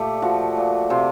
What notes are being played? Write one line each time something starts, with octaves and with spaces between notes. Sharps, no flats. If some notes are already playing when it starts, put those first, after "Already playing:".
Already playing: A#2 A3 G4
F3 F#4
A#2
C3 F4